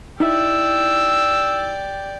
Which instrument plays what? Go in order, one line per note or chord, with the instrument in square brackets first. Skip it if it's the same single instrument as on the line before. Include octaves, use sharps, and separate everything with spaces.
[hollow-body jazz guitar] D#4 E4 E5 [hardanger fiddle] G4 D5 [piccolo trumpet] E6